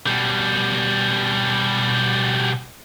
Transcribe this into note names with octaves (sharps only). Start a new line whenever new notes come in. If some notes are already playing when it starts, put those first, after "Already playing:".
B2 G3